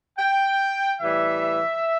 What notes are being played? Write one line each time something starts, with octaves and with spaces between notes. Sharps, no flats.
G5
A2 E3 G3 E5